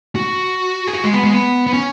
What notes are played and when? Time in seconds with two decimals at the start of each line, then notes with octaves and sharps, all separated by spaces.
0.16 F#4
0.87 G#4
0.93 F#4
1.04 G#3
1.13 B3
1.23 G#3
1.34 B3
1.67 B3
1.73 C#4